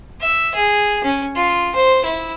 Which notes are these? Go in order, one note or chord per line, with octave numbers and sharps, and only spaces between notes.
E5
G#4
C#4
F4
C5
E4